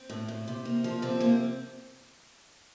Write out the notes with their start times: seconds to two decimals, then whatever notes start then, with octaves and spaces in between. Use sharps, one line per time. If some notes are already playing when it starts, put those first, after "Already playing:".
Already playing: C4
0.10 A2
0.28 A2
0.48 C3
0.65 A#3
0.84 F3
1.02 C3 C4
1.20 A#3